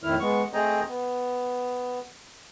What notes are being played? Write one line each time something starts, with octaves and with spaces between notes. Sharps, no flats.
F2 A2 D#3 E4 F6
G#3 B3 C#6
A3 C4 G#4 D#5 G5 A#5
B3